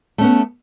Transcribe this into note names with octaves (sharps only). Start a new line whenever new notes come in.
A3 B3 C#4